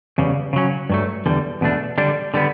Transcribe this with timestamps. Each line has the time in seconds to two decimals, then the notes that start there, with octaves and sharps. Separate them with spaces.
0.18 E2 C#3 G3
0.53 C#3 F#3 C#4
0.90 G2 F#3 A3
1.26 E2 D3 G3
1.61 E2 B2 A3 D4
1.98 D3 G3 D4
2.34 D3 G3 B3